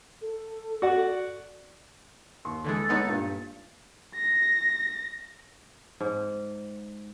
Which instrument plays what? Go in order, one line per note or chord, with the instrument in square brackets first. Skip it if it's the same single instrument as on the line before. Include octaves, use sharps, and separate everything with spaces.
[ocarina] A4
[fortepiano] F#4 D5 F#5
D#2 C6 C#6
[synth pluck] D3 E3 G#3 [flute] A4
[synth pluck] G#3 B3 D#4 [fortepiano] G#4 C#5
[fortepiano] G2 A#2 F4
[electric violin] A#6
[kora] G#2